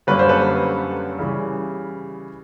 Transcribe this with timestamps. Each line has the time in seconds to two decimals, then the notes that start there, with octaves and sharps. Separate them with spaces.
0.07 F#2 D3 G3 A#3 C#4 B4
0.19 C5
0.29 A4 B4
1.19 C#3 E3 G3